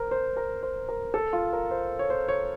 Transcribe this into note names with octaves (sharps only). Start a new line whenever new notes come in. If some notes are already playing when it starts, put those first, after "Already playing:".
Already playing: A#4 C5
C5
A#4
C5
A#4
A4
F4
A#4
C5
C#5
C5
C#5